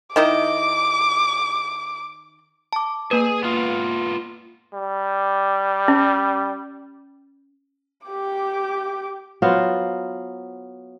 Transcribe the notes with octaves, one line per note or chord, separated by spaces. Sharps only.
D#3 E4 D#5 D6
A5 D6
A#3 G#4 B4 G#5
B3 F4
G3
C#4
G4 D6
F#3 B3 F4 C5